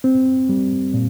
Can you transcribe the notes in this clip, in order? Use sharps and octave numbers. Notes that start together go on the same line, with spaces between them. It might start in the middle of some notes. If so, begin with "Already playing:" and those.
C4
G3
A#2